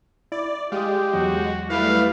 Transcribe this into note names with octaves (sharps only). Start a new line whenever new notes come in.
E4 D5
G#3 G4 F5 D#6
E2 F#3 F#4
G3 A3 E4 B4 F5